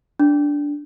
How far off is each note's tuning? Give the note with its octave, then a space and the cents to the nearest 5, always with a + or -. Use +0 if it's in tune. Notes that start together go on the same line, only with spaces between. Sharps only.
D4 -10